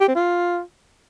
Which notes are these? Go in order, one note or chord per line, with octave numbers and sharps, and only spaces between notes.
G4
C4
F4